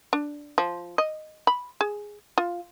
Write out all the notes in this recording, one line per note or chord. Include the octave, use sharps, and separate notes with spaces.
D4
F3
D#5
B5
G#4
F4